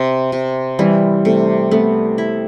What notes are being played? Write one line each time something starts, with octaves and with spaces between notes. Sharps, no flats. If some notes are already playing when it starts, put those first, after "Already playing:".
Already playing: C3
C3
E3 G3
C3 A3
A3 B3
E4